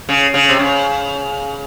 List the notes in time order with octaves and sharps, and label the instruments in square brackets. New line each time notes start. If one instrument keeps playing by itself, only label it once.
[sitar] C#3
C#3
C3
C#3